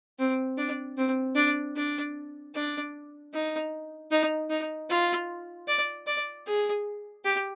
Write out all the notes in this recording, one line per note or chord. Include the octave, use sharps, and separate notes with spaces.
C4
D4
C4
D4
D4
D4
D#4
D#4
D#4
F4
D5
D5
G#4
G4